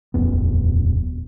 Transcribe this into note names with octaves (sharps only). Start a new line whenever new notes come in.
D#1 A#1 F2 B3